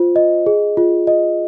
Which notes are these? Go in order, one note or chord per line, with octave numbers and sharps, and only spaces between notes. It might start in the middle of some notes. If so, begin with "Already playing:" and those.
Already playing: F4 C5
D#5
G#4
F4
D#5